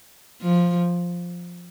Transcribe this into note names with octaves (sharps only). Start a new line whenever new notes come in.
F3